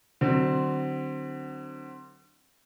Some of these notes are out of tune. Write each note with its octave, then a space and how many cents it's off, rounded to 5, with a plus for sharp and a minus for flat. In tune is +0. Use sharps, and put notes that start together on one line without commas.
D3 +35 F#3 +25 C4 +0